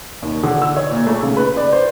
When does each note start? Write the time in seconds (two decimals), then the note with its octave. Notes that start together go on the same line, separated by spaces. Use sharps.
0.22 D#2
0.43 D3
0.62 E6
0.77 C#5
0.91 A#2
1.07 A3
1.23 C#3
1.37 B4
1.57 D5
1.72 C5